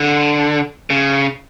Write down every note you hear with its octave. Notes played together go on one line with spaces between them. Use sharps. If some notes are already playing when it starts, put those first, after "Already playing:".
Already playing: D3
C#3